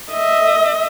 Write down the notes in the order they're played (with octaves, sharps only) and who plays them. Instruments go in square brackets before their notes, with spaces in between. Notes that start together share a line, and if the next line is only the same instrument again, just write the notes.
[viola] D#5 E5